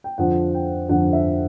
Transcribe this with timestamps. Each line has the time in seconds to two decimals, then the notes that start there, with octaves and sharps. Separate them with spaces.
0.04 G5
0.18 F2 D3 F3 F#5
0.54 G5
0.89 F2 D3 F3 F#5
1.13 E5